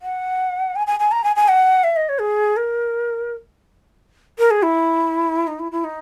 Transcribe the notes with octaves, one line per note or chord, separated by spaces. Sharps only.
F#5
G#5
G#5
G#5
A#5
G#5
G#5
F#5
E5
D#5
C#5
G#4
A#4
A#4
G#4
E4
D#4
E4
E4
D#4